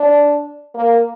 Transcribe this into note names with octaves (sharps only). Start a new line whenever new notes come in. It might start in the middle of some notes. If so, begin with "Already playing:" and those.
Already playing: D4
A#3